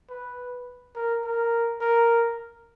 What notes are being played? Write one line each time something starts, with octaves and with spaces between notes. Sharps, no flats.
B4
A#4
A#4
A#4